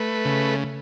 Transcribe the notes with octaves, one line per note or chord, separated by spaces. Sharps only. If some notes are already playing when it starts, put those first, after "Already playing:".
Already playing: A3 B4
C#3